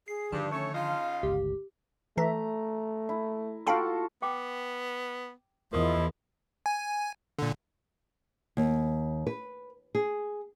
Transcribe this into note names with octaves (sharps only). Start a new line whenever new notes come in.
G#4 C7
G2 D3 D#3 F3 A5
A3 C#4 C#5
C#3 D#4 F4 F5
G1 C#2 G4
E3 A3 E5 A#5
E4
F4 F#4 A4 F5 G5 B5
B3 G5 D6
E2 F3 E4 F4 A#4 D#5 D#6
G#5
A#2 D3
D#2
B4
G#4